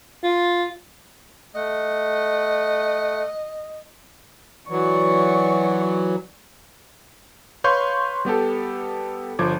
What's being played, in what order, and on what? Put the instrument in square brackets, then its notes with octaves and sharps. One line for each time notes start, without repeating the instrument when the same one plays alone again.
[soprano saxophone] F4
[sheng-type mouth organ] A3 F#5 [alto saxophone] D#5
[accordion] E3 F#3 [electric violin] D5 C#6
[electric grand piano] B4 C#5 F5 C6 C#6 G6
G3 B3 G4 A4
G1 F3 D6 G#6